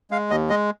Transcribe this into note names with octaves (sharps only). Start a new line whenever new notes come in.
G#3 F5
D#2 D#5
G#3 D#5